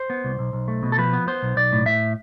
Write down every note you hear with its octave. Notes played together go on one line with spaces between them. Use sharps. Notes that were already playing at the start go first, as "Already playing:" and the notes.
Already playing: C5
B3
C2
B1
B1
A3
B2
A4
F3 B4
B3
B3 C5
B1
B1 D5
A2
A2 E5